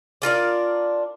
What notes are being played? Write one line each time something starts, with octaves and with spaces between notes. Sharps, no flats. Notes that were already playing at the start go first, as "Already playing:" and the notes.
D4 F4 A#4 D5